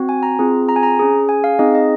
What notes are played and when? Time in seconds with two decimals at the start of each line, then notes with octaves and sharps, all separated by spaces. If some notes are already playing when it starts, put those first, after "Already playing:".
Already playing: C4 F#4
0.09 G#5
0.23 A#5
0.39 C4 F4 G#4
0.69 A#5
0.76 G#5
0.83 A#5
0.99 C#4 G#4
1.29 G#5
1.44 F5
1.59 C4 D#4 G#4 D#5
1.75 D#5